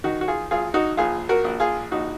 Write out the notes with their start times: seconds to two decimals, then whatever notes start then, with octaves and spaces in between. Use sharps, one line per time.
0.04 D#3 D#4 F#4
0.21 F#4
0.28 F4 G#4
0.51 G#1 F4 G#4
0.74 D#4 F#4
0.97 A#1 F4 G#4
1.29 F#4 A#4
1.44 A#1
1.60 F4 G#4
1.91 A#1 D#4 F#4